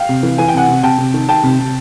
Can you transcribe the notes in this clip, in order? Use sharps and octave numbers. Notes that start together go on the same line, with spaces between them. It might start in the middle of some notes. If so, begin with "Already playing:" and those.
Already playing: F5 G5
C3
E3
E3 G#5
G5
C3 F#5 G#5
C3
C3 G5 A5
C3
D#3
D#3 G5 A5
C3
C3